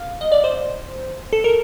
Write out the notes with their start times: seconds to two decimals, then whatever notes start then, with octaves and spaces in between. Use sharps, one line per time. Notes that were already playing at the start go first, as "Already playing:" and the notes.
Already playing: F5
0.21 D#5
0.32 D5
0.44 C5
1.33 A4
1.44 A#4